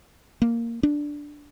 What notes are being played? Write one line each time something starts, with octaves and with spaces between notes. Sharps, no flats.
A#3
D4